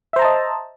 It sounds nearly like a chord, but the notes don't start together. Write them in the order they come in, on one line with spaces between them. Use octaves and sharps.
E5 C5 A#5 A5 D#5